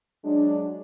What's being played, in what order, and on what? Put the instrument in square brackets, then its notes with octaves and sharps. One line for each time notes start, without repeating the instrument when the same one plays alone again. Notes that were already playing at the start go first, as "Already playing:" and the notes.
[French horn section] F#3 G#3 D4